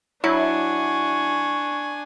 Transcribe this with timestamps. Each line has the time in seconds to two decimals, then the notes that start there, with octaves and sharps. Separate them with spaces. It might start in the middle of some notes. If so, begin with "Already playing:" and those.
0.24 F#3 D4 E4 G#5 C#6